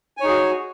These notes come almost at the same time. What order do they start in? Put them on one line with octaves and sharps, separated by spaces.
G#5 C#5 D#4 G#4 F#4